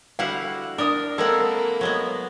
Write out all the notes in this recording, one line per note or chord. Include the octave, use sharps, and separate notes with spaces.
D3 G3 E4 F#4 F5 F#5
D4 A#4 D#6
G#3 A#3 C4 E4 A4 A#4 F#5
F#3 G#3 B3